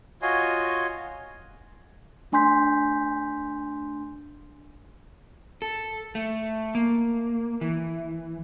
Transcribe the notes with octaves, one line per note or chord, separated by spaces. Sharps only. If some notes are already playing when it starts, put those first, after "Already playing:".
F4 F#4 C#5 D#5 G#5 C6
A3 D4 G#5 C6 G6 B6
A4
A3
A#3
E3